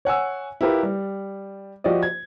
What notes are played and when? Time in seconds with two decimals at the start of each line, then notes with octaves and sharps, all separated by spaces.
0.05 C#5 F#5 G#5 E6
0.61 E4 F4 G4 A#4 B4
0.83 G3
1.84 F3 F#4 G4 D5 D#5
2.03 G#6